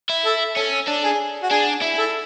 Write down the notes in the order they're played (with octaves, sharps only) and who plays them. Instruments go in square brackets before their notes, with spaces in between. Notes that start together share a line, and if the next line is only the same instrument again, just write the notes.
[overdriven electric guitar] E4
[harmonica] A4
[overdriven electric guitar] C#4 [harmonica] A4
[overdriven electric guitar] D4
[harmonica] G#4
F#4
[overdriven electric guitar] D4 [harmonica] G#4
[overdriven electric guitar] E4
[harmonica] A4